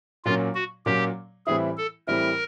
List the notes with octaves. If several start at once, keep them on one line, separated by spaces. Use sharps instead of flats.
A#2 F#3 A#3 C#4 F4
F#4
A#2 F#3 A#3 C#4 G4
A2 E3 G3 C4 E4 G#4
A4
A2 E3 G3 C4 E4 A#4